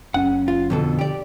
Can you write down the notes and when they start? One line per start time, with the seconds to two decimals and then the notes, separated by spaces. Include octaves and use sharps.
0.14 F#1 C#3 C#4 F#5
0.48 F4
0.70 F2 B2 D3 A4
0.99 G4 D5